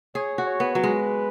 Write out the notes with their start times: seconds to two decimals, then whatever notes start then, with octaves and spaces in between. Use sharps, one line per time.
0.15 G#4 C#5
0.38 F#4
0.46 C#5
0.60 B3
0.75 F#3 B4
0.83 G#3